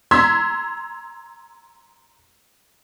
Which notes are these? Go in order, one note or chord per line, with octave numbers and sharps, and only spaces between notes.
A#5 C6 E6 G#6 B6